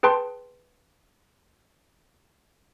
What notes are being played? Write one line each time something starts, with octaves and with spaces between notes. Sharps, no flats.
G#4 B4 G5 A5 C6